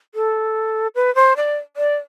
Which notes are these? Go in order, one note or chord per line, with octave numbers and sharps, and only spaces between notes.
A4
B4
C5
D5
D5